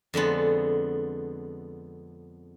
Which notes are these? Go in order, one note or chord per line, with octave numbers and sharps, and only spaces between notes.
F2 D3 G#3 B3